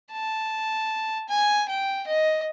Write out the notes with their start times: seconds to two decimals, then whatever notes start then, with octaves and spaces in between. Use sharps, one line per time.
0.12 A5
1.29 G#5
1.69 G5
2.07 D#5